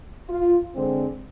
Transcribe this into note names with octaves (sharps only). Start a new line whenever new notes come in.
F4
D3 G#3 C4